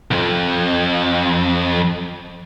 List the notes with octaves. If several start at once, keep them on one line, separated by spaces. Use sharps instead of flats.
C2 F2